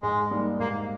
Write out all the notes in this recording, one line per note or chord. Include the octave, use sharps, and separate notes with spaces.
G#2 G#3
G3 A#3 D#4
G#2 A#3